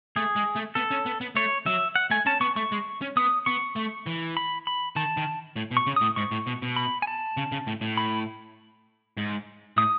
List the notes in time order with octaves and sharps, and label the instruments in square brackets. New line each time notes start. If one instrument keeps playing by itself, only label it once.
[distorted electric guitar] A3 [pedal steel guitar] G#4
[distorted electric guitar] G#3
A3
[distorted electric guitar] B3 [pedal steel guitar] A4
[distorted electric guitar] C#4
B3
B3
[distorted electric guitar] A3 [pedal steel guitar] C#5
[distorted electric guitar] F#3 [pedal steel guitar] E5
[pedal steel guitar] F#5
[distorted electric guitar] A3 [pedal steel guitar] G#5
[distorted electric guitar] C#4 [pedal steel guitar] A5
[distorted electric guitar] B3 [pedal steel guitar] C#6
[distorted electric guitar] A3 [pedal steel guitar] C#6
[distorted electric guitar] G#3
C#4
[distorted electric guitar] B3 [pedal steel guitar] D#6
[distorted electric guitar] B3 [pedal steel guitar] C#6
[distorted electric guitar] A3
E3
[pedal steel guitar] B5
B5
[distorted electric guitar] D#3 [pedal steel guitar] A5
[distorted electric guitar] D#3
A2
B2
[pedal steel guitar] C#6
[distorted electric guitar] C#3
[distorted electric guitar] A2 [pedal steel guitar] D#6
[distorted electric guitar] G#2 [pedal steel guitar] C#6
[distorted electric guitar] A2
B2
B2
[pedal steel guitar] B5
G#5
A5
[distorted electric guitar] C#3
C#3
A2
A2
[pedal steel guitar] B5
[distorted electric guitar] G#2
[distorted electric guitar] A2 [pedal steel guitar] D#6